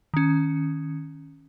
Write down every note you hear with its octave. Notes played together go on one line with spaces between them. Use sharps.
D#3 C#4